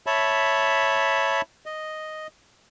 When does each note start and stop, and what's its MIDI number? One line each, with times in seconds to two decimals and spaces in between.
0.06 1.41 73
0.06 1.41 76
0.06 1.41 81
0.06 1.41 83
1.66 2.27 75